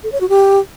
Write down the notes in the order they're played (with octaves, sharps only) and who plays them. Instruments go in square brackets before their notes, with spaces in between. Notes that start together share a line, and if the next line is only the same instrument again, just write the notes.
[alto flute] A4
C#5
F#4
G4